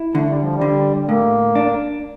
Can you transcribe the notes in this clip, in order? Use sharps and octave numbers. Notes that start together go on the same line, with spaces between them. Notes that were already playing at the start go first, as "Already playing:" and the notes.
Already playing: E4
D3 A3
G3
F3
G3
D3
A2 A#3
D4